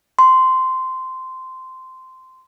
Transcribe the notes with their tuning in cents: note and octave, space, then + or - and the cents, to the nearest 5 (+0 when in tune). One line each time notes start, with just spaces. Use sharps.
C6 -10